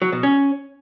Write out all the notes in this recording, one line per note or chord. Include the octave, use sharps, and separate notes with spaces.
F#3
B2
C#4